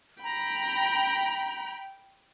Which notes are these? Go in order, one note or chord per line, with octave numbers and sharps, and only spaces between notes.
G5 A#5 B5